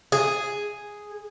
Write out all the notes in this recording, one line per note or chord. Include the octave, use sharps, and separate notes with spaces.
G#4